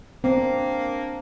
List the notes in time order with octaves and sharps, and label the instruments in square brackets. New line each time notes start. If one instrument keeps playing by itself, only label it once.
[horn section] A#3 D4 [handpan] C4